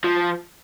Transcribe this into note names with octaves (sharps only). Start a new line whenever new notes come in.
F3